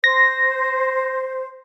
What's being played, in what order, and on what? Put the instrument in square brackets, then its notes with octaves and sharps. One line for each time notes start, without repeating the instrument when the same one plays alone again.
[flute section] C5 [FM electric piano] A#6